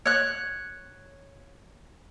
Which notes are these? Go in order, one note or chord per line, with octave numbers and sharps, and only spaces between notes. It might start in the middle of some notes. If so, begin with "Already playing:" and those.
C#5 F#6